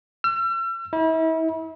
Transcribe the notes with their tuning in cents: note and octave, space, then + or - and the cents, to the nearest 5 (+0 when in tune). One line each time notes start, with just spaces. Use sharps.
E6 +45
E4 -40